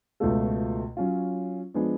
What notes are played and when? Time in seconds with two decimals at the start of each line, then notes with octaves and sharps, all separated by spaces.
0.20 C#2 B2 A3 F4 A4
0.97 F#3 C#4 F4
1.74 F3 G#3 B3 D4